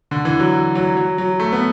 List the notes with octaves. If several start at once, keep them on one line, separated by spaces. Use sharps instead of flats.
D3
E3
F#3
F#3
F#3
F#3
A3
B3